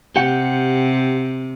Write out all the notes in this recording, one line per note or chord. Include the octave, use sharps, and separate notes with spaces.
C3 G4 F#5